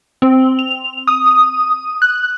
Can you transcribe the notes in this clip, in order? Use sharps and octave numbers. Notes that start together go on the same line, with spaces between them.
C4
F7
D#6
F#6